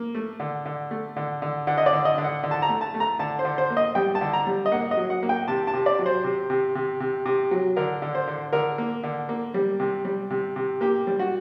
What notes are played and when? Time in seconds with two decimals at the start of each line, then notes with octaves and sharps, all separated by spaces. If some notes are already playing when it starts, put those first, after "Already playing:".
Already playing: A#3
0.15 A3
0.40 D3
0.66 D3
0.91 A3
1.16 D3
1.42 D3
1.67 D3 F#5
1.78 D#5
1.86 D5
1.93 D3
2.05 D#5
2.18 D3
2.24 F#5
2.43 D3
2.51 A5
2.62 A#5
2.69 A3
2.81 A5
2.94 A3
3.00 A#5
3.19 D3 A5
3.39 C5
3.45 D3
3.58 C5
3.70 A#3
3.77 D#5
3.95 G3 G5
4.15 A5
4.21 D3
4.33 A#5
4.47 G3
4.66 D#5
4.72 A#3 F#5
4.91 D#5
4.97 F#3
5.10 F#5
5.23 A#3
5.29 G5
5.48 C3 A5
5.67 A5
5.73 C3
5.86 D5
5.99 F#3
6.06 C5
6.24 C3
6.50 C3
6.75 C3
7.00 C3
7.26 C3
7.51 F#3
7.76 D3 A#4
8.02 D3
8.15 C5
8.27 D3
8.53 D3 A#4
8.78 A#3
9.03 D3
9.29 A#3
9.54 G3
9.80 C3
10.05 G3
10.30 C3
10.56 C3
10.81 A#3 G4
11.07 G3
11.19 F#4